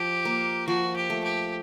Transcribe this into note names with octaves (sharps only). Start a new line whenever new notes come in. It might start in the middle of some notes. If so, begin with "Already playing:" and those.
Already playing: F3 G4
A#3
F3 F#4
G4
A3
G4